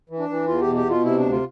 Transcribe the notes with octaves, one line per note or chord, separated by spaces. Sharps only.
E3
D4
E3
E2 F4
G4
B2
G4
B2 F4
C3 E4
D2 D4
F4